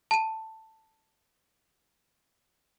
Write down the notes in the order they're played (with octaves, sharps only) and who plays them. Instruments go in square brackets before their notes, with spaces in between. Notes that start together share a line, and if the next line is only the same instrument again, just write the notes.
[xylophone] A5 D#7